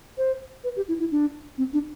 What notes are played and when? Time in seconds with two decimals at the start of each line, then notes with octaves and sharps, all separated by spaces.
0.18 C5
0.64 B4
0.76 G4
0.88 E4
1.00 E4
1.11 D4
1.58 C4
1.73 D4